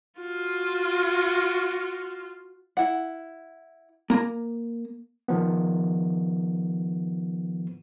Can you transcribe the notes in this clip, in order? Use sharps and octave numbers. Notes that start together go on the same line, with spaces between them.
F4 F#4
E4 F#5
A#3 A#5
D#3 F3 B3